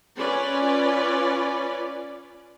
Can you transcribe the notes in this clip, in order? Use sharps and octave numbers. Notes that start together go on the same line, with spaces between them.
C#4 F4 B4 D5